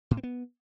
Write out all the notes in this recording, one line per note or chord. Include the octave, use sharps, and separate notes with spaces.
A2
C4
B3